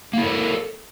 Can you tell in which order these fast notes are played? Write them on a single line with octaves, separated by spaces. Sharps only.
A#3 E4 A#4 A4